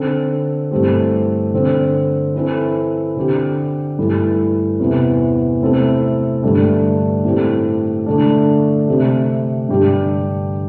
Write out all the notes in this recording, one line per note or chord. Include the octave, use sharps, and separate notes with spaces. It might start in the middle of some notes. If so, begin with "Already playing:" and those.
Already playing: D3 C4 A4
G2 E3 A3 C4 G4
D3 C4 A4
E3 C4 E4 A4
D3 C4 G4
G2 E3 A3 E4 A4
E2 C3 E3
C3 A3 C4 E4 A4
G2 D3 A3 D4 G4
A2 A3 C4 G4
D3 A3 D4
C3 A3 C4 G4
G2 D3 G3 D4 G4